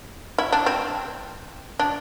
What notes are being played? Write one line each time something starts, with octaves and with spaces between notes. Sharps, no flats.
E4
D4
C4
D4